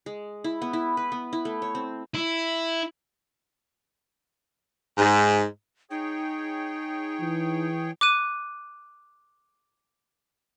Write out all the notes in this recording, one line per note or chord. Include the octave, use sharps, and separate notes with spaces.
G#3
E4
B3
E4
B4
B3
E4
A3
C#5
C4
E4
G#2
D#4 G#4 C#5 G5
E3
D6 F#6 D#7